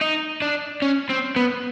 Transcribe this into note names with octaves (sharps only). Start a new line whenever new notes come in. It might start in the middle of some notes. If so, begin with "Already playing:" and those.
D#4
D4
C#4
C4
B3